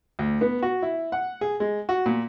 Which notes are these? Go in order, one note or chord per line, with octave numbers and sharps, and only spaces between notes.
D2
B3
F#4
E4
F#5
G#4
G#3
F#4
A#2